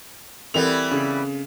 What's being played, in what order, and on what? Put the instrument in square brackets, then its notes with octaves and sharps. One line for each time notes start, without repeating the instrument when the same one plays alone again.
[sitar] E3 G3 B3 [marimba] C4 A4 A#4 [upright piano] F7
[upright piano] C#3